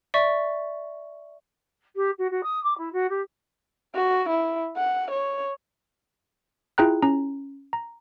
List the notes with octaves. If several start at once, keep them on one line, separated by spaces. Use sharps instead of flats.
D5 E5 C#6
G4
F#4
F#4
D#6
D6
E4
F#4
G4
F#4
E4
F#5
C#5
E4 F4 G#4 G5 A#5 F#6
C#4 A#5
A#5